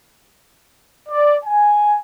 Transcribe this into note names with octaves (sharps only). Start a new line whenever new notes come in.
D5
G#5